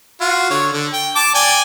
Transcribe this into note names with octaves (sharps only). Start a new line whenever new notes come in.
F4 F#4
D3 C#5
D3
G5
A5 D6
D5 G5 G#5